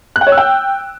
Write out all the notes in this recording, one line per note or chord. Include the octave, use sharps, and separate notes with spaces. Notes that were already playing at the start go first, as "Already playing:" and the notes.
F#6
G5
C#5
E6
G5